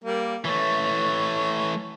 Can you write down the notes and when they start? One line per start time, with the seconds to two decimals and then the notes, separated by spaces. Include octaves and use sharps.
0.04 G3 A#3
0.45 E3 A3 C#5